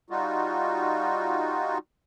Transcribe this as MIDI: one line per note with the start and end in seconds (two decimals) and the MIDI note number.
0.10 1.78 55
0.10 1.78 63
0.10 1.78 65
0.10 1.78 66